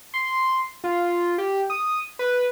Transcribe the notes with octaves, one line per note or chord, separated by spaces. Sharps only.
C6
F4
G4
D#6
B4